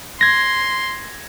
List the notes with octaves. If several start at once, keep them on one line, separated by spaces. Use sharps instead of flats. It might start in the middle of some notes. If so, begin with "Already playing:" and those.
C6 G#6 A#6